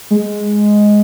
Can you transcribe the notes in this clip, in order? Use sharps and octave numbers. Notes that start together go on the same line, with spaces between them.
G#3